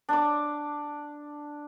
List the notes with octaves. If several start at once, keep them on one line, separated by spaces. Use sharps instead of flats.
D4 D6